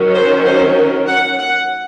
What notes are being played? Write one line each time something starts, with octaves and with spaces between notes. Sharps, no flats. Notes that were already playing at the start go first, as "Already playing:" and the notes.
Already playing: D#3 F#3 C#4
C5
C5
A#4
F#5
F#5